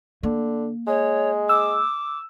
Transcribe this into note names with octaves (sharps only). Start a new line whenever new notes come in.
D3 A#3
G#3 C#5
D6 E6